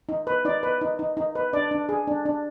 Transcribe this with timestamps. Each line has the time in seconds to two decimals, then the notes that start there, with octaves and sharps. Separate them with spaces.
0.09 D#4
0.27 B4
0.45 D#4 D5
0.63 B4
0.81 D#4
0.99 D#4
1.17 D#4
1.35 B4
1.53 D4 D5
1.71 D4
1.89 G#4
2.07 D4
2.26 D4